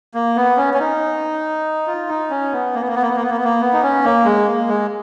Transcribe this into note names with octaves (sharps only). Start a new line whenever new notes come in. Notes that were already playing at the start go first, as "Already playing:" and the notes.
A#3
B3
C#4
C#4
D#4
F4
D#4
C#4
B3
A#3
B3
A#3
B3
A#3
B3
A#3
B3
A#3
B3
A#3
B3
D#4
C#4
A#3
G#3
A#3
G#3